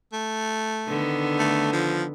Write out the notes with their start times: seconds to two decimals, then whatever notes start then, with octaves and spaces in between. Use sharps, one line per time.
0.13 A3
0.88 D3 D#3 B3
1.39 A3
1.73 F3